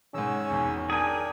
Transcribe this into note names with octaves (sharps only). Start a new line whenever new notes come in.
G#2 D#3 C#4 G#4 C#5 E6
G#1 E2
D4 G#4 A#4 G5 G#5